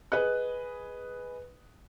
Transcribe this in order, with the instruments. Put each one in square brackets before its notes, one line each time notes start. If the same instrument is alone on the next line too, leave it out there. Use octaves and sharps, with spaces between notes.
[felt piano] G#4 B4 D#5 F#6